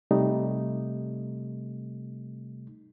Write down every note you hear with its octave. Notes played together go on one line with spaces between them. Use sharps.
C3 G3 A3 D#4